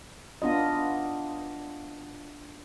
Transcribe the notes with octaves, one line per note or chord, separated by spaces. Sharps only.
B3 D4 F4 D#5